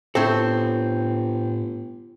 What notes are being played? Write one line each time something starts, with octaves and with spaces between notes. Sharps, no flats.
G1 A2 C4 A4